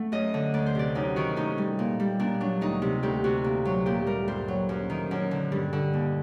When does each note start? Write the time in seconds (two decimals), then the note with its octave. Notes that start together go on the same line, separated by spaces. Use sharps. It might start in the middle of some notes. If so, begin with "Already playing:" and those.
Already playing: A3 F#5
0.12 F#2 D#5
0.34 D3
0.54 D2 D5
0.66 C5
0.75 C3 D5
0.95 F#2 D#4
1.16 D#3 F#4
1.36 A2 D#4
1.58 G3
1.79 A#2
2.00 G3
2.19 A#2 D4
2.41 F#3 D4
2.61 D2 D#4
2.82 C3
3.03 D2 G4
3.24 C3 F#4
3.44 A#2
3.65 F#3
3.86 A#2 G4
4.06 G3 A#4
4.28 G2 C5
4.48 F#3
4.69 F#2
4.90 D#3
5.11 F#2
5.31 D3
5.52 G2
5.73 D3
5.93 D#2